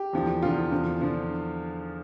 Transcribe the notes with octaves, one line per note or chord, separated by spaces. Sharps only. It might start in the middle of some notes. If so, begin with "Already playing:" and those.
Already playing: G4
E2 D3 F3
E2 D3 F3 F4
E2 D3 F3
D3 F3